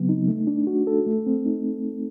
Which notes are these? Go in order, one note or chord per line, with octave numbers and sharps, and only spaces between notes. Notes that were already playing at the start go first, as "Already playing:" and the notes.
Already playing: C#3 F#3 B3 C4
D#4
A3
D4
F#4
A4
A3
C4
D#4